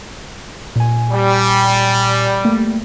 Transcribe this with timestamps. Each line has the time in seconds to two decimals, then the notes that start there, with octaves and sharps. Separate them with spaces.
0.76 A#2 G#5
1.11 G3
2.45 A3 A#3